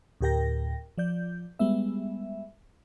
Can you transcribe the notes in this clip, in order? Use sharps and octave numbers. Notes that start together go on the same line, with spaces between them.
D2 A2 G4 A#4 G5 A#6
F3 D5 G6
G3 G#3 B3 E5